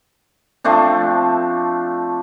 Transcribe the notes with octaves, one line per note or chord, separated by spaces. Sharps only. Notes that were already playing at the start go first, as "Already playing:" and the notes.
F3 A3 C4 D4